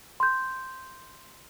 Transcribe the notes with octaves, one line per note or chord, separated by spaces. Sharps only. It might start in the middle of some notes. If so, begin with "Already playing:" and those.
C6 G6